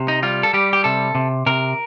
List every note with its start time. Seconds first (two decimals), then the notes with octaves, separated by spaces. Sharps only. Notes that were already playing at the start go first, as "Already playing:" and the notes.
Already playing: C3
0.08 D#4
0.23 G3 F4
0.43 A4
0.53 G3 G4
0.73 G4
0.84 C3 A4
1.15 C3
1.46 C3 A#4